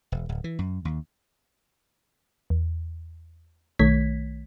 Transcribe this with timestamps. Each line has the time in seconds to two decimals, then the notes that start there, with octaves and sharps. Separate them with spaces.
0.12 E1
0.29 D1
0.44 E3
0.59 F#2
0.85 D#2
2.50 E2
3.79 B1 D#3 A3 C#5 G#6 B6